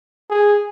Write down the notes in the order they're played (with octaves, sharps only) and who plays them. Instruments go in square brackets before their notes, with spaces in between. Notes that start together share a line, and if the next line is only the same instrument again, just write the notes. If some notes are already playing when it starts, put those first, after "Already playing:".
[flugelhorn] G#4